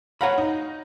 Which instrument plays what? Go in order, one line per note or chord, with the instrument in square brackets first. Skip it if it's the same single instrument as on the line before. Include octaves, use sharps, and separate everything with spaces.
[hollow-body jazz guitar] C#5 A#5 B5 [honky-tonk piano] F5 F#5
[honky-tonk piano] D#4